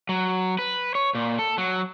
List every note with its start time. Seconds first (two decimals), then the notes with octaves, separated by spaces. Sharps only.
0.09 F#3
0.59 B4
0.95 C#5
1.15 A#2
1.39 A4
1.58 F#3